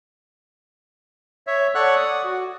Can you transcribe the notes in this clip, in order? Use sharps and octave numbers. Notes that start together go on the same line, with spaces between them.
C#5 E5
A4 C#5 D5 F#5 C#6 F#6
D5 D#6
F#4